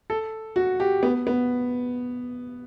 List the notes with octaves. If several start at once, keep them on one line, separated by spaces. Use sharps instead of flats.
A4
F#4
G4
B3
B3